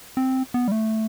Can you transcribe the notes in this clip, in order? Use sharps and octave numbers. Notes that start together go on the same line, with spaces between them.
C4
B3
G3
A3